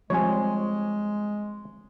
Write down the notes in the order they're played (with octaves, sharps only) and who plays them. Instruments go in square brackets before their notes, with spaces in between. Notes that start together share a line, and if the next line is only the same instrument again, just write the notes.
[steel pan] F3 G3 C4 [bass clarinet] G#3 [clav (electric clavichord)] C#5 G#5